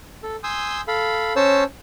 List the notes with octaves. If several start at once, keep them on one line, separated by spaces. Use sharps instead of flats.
A4
G#5 C6 D#6 E6 G6
A4 F5 B5
C#4 C5 C#5 A5 E6